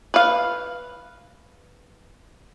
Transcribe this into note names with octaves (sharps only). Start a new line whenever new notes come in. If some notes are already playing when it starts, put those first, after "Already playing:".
B4 F5